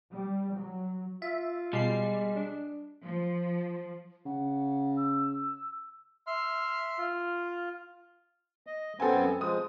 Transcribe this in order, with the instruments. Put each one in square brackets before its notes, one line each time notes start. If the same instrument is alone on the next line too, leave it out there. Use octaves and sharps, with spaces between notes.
[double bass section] G3
F#3
[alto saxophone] F4 [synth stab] E5
[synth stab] B2 C7 [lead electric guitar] G3 [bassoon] G#3
[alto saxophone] D4
[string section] F3
[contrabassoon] C#3 [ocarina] F#5
[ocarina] E6
[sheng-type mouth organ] E5 C6 F6
F4
[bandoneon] D#5
[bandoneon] F#2 B3 C4 [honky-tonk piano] A4 G#5
[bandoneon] F3 G#3 [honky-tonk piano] D#6